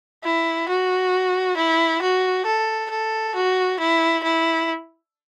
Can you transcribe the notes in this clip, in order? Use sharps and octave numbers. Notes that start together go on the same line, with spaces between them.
E4
F#4
E4
F#4
A4
A4
F#4
E4
E4